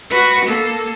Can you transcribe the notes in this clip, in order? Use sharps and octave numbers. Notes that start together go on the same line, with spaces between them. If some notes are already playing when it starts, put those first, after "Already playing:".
F#4 B4
A#3 A4